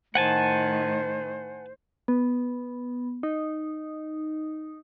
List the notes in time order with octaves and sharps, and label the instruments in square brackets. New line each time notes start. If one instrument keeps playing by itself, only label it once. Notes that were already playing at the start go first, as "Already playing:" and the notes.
[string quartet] A2 D#3 [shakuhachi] C5 [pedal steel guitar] F#5 G#5 A5
[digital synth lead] B3
D#4